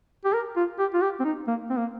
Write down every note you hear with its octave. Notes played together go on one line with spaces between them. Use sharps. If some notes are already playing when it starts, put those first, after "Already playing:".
G4
A#4
F4
G4
F4
G4
C4
D#4
A#3
C4
A#3